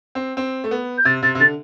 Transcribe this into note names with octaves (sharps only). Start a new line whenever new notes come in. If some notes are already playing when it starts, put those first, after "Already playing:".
C4
C4
A3
B3
G6
C3 A6
C3 A6
C3
D3 A6